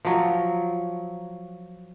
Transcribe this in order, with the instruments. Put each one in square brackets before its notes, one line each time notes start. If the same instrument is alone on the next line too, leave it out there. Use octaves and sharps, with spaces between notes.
[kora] F3 F#3